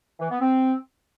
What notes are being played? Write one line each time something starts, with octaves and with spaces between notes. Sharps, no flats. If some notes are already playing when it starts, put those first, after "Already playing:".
E3
B3
C4